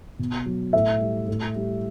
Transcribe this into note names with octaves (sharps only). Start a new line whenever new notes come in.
B2
F#3
A2 E5
G3
A2
G3